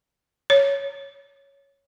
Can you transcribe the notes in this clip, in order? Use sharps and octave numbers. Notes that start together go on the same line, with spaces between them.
C#5